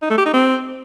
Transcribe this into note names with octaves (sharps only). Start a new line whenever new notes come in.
D#4
A3
G4
D#4
C4